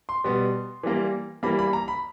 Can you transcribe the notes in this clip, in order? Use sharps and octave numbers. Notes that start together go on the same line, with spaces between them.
C6
B2 G3 B3
E3 G3 A#3
E3 G3 A#3 B5
B5
A#5
B5